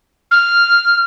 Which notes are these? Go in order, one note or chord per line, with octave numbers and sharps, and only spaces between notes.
F6